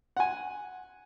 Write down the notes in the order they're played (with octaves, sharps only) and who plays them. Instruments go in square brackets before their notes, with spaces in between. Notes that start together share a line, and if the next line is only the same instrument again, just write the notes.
[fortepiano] F#5 G#5